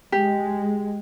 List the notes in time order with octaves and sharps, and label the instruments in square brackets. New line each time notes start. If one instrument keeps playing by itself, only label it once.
[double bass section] G#3 [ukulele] G4